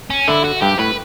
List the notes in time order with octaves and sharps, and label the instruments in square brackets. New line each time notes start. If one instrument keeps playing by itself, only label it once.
[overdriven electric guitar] C#4
[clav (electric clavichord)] D3 [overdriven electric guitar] E4
[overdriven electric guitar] F#4
[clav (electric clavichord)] G2 [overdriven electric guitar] G4
[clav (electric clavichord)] A2 [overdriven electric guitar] B4